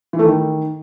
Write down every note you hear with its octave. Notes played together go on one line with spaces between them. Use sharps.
E3
A3
D#3